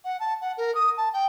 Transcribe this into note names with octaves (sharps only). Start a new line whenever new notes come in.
F#5
A5
F#5
A#4
D#6
A5
G5